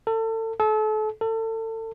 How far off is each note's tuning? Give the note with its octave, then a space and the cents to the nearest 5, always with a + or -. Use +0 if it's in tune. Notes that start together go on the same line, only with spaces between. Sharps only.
A4 +30
A4 -35
A4 +30